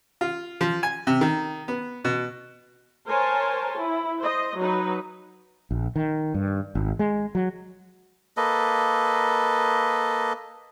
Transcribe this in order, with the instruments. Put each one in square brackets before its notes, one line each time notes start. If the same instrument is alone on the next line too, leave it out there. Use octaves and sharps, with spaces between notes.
[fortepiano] F4
F3
G#5
C3
D#3
B3
B2
[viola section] A#4 C5 C#5 G#5 A5
E4
C5 D#5
F#3 D#4 B4
[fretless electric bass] A#1
D#3
G2
G#1
G#3
F#3
[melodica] A#3 A4 B4 D#5